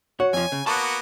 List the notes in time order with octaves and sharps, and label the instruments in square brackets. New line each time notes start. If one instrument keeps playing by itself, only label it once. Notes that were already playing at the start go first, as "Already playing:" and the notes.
[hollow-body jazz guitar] F#4 [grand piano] C#5
[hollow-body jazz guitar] F2 F3 [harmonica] G#5
[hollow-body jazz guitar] C#3
[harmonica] A#3 B3 F#4 [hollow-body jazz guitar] A5